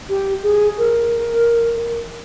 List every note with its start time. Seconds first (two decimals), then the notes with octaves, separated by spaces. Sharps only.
0.09 G4
0.43 G#4
0.78 A#4